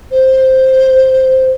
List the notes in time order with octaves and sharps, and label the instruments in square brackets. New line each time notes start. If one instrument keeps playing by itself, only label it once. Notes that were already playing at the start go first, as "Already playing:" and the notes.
[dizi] C5